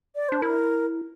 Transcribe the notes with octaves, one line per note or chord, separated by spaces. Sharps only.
D5
D4 C5
E4 A#4